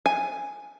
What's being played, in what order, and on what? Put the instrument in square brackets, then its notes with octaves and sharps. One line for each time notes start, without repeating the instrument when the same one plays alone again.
[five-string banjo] G#5